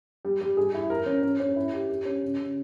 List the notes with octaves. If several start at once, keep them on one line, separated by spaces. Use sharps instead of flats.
G3
G3
G#4
E4
A#4
C#4
C#4
C#4
E4
G4
G4
C#4
C#3
C#3